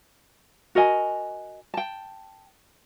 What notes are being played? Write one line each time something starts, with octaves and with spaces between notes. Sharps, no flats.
F#4 A#4 D#5 G#5
G5 A5